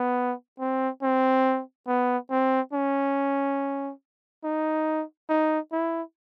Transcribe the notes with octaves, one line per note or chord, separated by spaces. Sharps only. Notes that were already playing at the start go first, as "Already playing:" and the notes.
Already playing: B3
C4
C4
B3
C4
C#4
D#4
D#4
E4